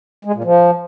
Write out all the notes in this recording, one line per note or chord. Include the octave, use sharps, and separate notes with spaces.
G#3
A#2
F3